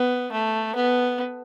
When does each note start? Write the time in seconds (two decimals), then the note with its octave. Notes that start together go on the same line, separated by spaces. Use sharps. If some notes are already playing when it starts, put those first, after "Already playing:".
Already playing: B3
0.32 A3
0.76 B3